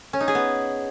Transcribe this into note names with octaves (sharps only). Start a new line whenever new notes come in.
C#4
D#4
G#4
B3